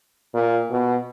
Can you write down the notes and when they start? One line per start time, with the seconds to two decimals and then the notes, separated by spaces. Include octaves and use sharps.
0.34 A#2
0.71 B2